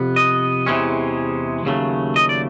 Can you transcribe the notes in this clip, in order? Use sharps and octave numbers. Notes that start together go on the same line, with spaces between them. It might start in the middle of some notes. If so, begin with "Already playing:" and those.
Already playing: F2 C3 B3
D#5
E2 C3 E3 G#3 C#4
D#2 C#3 F#3 A3
D#5
D5